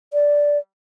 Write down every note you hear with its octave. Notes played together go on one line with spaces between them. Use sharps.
D5